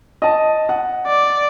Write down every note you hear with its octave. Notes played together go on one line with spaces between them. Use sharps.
D#5 A5
F#5
D5